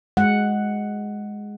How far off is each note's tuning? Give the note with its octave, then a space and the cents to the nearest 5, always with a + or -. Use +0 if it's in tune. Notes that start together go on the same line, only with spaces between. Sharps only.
G#3 +0 F#5 +0